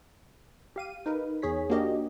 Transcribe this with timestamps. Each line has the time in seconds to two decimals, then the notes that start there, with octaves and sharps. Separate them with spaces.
0.76 G4 F5 D#7
1.06 D#4 A#4 B4
1.42 E2 G#4 C#5 B6
1.70 A#3 D4 F#4 G4 A#4 D#5